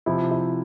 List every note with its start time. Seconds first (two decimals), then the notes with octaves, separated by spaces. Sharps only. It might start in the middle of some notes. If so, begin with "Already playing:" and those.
0.06 C3 F3 C4 E4
0.31 E4